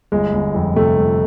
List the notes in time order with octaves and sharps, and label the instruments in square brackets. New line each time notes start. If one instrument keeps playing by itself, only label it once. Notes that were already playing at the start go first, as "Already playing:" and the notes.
[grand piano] G1 G#3
G1
F2
C3 A3
G1